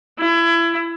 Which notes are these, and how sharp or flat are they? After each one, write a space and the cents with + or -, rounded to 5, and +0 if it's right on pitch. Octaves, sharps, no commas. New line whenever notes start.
E4 +30